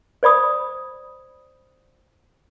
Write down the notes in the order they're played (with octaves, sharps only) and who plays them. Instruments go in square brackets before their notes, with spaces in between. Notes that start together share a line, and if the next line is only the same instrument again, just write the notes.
[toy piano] C5 D5 B5 D#6